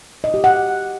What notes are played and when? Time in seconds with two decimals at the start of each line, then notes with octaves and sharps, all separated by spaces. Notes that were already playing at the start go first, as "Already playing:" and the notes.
0.24 D#5
0.34 G4
0.44 F#5